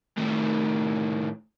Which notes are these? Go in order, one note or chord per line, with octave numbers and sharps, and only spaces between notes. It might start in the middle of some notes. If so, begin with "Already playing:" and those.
A2 D#3